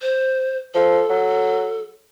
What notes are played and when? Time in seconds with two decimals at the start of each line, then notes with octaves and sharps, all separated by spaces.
0.02 C5
0.74 F3 A4
1.10 F#3